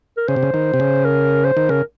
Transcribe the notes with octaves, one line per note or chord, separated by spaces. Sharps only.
A#4
C#3 C5
C3
C#3
D#3
C3
C#3
A#4
C5
D#3
C#3 A#4